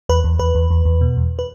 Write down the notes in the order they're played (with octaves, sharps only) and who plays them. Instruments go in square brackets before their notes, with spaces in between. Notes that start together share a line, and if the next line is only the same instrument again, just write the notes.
[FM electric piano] E2 B4
E2
E2 B4
E2
E2
E2
B2
E2
B4